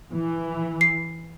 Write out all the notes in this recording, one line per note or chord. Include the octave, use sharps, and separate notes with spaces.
E3
C7